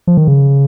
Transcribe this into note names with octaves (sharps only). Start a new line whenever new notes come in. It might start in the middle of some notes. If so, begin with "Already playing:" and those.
F3
D#3
C#3